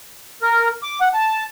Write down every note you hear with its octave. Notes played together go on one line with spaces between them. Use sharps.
A#4
D6
F#5
A5